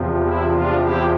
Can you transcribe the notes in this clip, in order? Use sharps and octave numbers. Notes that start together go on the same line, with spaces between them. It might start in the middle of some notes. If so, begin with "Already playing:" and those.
Already playing: E2 C3 F3
E4
D4 F4
E4 G4